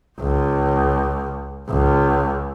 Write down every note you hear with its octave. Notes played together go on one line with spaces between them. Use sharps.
C#2
C#2